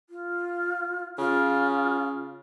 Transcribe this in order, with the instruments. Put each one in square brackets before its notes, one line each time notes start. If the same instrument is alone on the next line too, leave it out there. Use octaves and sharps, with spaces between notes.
[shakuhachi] F4
[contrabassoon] C#3 [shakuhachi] F4